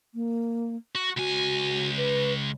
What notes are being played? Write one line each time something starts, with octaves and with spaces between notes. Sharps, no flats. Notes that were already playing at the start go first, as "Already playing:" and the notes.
A#3
F#4
C#2 F#4 G#5
B4